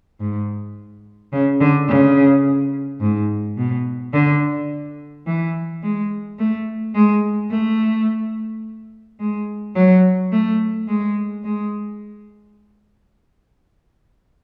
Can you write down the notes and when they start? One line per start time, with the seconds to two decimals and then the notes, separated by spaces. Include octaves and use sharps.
0.20 G#2
1.32 C#3
1.60 D3
1.88 C#3
3.01 G#2
3.57 B2
4.13 D3
5.26 E3
5.82 G#3
6.39 A3
6.94 G#3
7.51 A3
9.20 G#3
9.75 F#3
10.32 A3
10.88 G#3
11.44 G#3